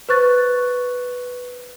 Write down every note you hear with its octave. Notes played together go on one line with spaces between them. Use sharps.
B4 C5 C#6 F#6 A6